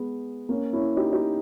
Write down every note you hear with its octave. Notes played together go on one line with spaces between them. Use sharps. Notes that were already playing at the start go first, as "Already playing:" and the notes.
Already playing: G#3 B3
A#3 C#4
C#4 E4
D#4 G4
D#4 G4